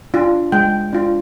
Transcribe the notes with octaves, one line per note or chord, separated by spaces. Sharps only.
D4 F4
G#3 G5
D4 F4